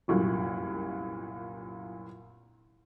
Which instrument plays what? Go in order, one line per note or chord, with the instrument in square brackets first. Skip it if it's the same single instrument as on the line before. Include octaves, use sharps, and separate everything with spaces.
[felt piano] G1 C2 F#2 A#2